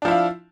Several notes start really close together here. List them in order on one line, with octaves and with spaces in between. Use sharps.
D4 F3 E4 F4